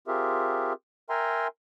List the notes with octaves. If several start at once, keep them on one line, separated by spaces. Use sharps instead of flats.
C4 F4 G4 G#4 A#4 E5
A#4 E5 G5 G#5 A#5 C6